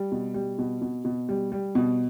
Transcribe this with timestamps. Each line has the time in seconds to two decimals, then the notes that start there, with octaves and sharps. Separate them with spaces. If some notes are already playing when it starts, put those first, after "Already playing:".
Already playing: G3
0.12 B2
0.34 G3
0.58 B2
0.82 B2
1.05 B2
1.29 G3
1.52 G3
1.75 B2